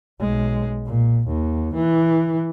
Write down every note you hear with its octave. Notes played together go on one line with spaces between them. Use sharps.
B1 G#3
A#2
D#2
E3